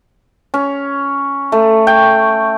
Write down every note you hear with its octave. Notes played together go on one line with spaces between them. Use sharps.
C#4
A3
G5